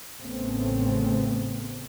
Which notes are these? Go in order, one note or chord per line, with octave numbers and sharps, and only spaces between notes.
A1 A2 C#3 A3 B3 C4